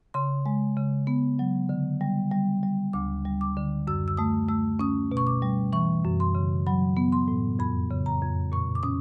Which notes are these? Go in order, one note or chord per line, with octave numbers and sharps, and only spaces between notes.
C#3 C6
G#3
C#3
B3
F#3
D3
G3
G3
G3
D2 D6
G3
D6
D3
F#2 E6
E6
A3 D#6
A3 E6
C#4 D#6
B2
C#6
D6
G3
E3 C#6
F#2
C6
C#3
F#3 B5
B3
C6
A2
F2 B5
C#3
A#5
F2
A#2 C#6
D6
C#4 D#6